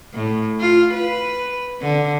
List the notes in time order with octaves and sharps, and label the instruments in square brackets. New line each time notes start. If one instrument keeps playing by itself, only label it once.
[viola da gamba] A2
F4
B4
D3